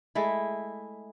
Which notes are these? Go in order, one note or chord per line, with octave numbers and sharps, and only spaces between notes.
G#3 A3 E4